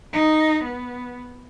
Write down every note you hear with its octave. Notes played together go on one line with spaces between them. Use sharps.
D#4
B3